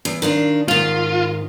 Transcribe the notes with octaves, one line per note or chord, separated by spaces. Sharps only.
E2
D#3 D4 F4
G#2 D#3 F4